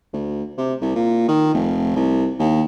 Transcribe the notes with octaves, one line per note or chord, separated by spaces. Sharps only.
D2
C3
C2
A#2
D#3
F1
C2
D#2